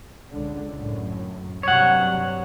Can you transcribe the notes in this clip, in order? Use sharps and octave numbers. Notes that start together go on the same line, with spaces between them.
C#2 D3
F#2 A2
G2 C3 F#3 C#5 F#5